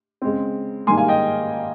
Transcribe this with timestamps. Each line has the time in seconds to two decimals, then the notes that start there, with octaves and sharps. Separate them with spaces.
0.22 C#3 G#3 C4
0.87 G#2 D#3 G3 A#3 G#5 C6
0.97 F5 G#5
1.08 D#5 G5